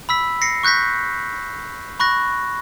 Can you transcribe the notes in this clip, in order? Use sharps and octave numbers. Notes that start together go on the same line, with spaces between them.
B5 E6 B6
A#6 C7 C#7
C#6 F#6 G6 A#6 B6
B5 C#6 F#6 A#6